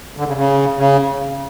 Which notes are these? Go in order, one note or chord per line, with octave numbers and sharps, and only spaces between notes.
D3
C#3
C#3
C#3